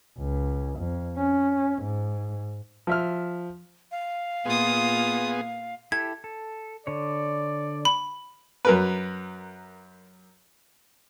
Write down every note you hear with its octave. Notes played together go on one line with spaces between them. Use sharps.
C#2
F2
C#4
G#2
F3 E5 F6
F5
A#2 B3 F4 G#4 D#6
E4 G4 A4 G#6
A4
D3 C#5 D5
B5
F#2 A#4 B4